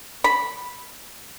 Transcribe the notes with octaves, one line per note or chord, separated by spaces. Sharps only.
B5